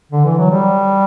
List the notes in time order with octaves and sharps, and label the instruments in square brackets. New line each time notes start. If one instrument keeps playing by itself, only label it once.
[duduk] D3
E3
F#3
G3